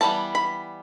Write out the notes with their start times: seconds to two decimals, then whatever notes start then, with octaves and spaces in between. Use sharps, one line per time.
0.01 E3 G3 B3 A5
0.35 B5